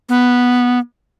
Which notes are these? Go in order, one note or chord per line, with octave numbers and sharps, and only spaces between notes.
B3